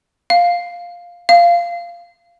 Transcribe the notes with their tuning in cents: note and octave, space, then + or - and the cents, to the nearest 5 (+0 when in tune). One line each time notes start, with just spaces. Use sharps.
F5 +5
F5 -15